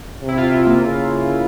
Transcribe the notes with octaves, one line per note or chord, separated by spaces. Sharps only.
C3
E4
F4
E4
A#3
C#3